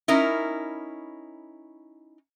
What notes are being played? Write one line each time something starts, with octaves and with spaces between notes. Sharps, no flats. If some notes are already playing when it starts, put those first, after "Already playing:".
C#4 D#4 E4 A#4